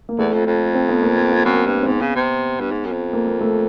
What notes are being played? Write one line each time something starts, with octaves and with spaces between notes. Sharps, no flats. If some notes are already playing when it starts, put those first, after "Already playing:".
A#3
E2 A3
F2
F2
C4
B3
A#3
B3
B3
F#2 C4
G2
C4
G#2 B3
C#3
C3
G2
G#2
F#2
F2
A#3
A#3
A3